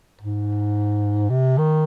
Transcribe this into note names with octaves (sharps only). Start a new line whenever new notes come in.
G#2
C3
D#3